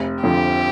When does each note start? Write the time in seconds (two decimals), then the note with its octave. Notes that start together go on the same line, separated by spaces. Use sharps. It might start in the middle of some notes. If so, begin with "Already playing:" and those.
Already playing: F1
0.22 F2 D3 F3 G4